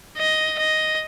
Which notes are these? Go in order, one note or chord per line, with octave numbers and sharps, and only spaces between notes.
D#5
D#5